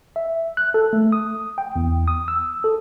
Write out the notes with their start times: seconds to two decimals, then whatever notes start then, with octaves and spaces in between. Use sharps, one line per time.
0.16 E5
0.57 F#6
0.74 A4
0.93 A3
1.12 D#6
1.58 G5
1.76 E2
2.08 D#6
2.28 E6
2.64 A4